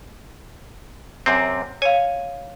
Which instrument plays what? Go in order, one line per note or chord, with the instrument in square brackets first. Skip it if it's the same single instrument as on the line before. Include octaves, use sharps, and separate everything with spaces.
[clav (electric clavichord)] F#2 C3 C4
[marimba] C#5 F5 [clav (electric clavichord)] G#5